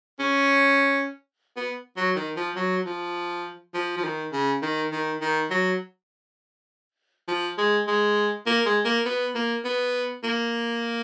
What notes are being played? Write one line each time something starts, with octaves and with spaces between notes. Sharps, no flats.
C#4
B3
F#3
D#3
F3
F#3
F3
F3
F3
D#3
C#3
D#3
D#3
D#3
F#3
F3
G#3
G#3
A#3
G#3
A#3
B3
A#3
B3
A#3